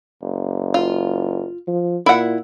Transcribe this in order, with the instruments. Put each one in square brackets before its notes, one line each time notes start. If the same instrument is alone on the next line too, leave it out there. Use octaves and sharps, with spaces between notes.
[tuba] F#1
[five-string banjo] F4
[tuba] F3
[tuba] A#2 [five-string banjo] E4 F#5